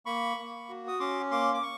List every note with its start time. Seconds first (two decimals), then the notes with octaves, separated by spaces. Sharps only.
0.06 A#3 B5 C#6
0.37 A#3
0.69 F#4
0.88 D#6
1.00 C#4 C6 D6
1.31 A#3 C6 D6
1.54 D6
1.63 C#6